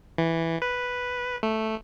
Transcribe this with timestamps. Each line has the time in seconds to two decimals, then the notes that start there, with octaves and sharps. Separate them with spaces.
0.18 E3
0.62 B4
1.43 A3